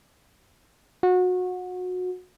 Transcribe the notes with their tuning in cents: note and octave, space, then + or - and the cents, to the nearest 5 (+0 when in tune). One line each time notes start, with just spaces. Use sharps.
F#4 -25